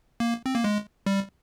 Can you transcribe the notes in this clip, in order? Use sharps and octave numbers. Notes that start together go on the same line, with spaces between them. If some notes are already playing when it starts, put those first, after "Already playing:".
A#3
C4
A#3
G#3
G3